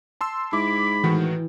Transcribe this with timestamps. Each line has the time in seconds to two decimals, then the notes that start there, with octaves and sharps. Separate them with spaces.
0.21 A5 C6 E6
0.53 G#2 E4 B5 D6
1.04 A2 D#3 E3 F#4